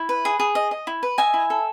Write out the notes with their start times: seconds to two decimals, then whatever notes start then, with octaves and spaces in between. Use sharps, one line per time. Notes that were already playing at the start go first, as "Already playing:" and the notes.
Already playing: E4
0.09 B4
0.25 G#4
0.40 G#4
0.55 D#5
0.71 D#5
0.87 E4
1.03 B4
1.18 D#5 E5 G#5
1.34 E4
1.50 A4